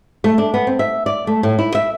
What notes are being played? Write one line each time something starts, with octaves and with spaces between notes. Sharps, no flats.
A3
D4
B3
C4
E5
D5
A3
A2
E4
E5